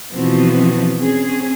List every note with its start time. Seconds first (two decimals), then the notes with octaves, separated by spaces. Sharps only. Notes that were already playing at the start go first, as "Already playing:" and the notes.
0.13 B2 E3 F3 B3 C4 F#4
0.97 C4 C#4 G#4